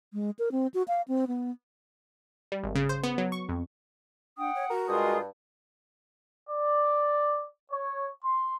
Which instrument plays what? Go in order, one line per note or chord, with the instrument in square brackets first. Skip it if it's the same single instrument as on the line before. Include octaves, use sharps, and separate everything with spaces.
[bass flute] G#3
A#4
C4
F#4
F5
C4
B3
[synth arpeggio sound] G3
G#1
C#3
C5
B3
F#3
C#6
F2
[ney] D4 [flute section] F#5 G5 D#6
[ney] C#5
[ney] F#4 [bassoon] A#4
[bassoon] G2 [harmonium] G#3 G#4 A#4 [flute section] F4 C6 D#6
[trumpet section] D5
C#5
C6